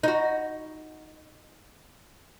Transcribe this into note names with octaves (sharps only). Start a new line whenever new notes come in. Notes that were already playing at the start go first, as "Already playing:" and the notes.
D#4 F#4